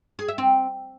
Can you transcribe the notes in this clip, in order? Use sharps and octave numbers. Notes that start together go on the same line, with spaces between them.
G#4
E5
C4